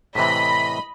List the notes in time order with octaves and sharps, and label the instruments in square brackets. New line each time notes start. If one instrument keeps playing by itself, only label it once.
[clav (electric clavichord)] A2 C3 E3 [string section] D#5 B5 [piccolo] B6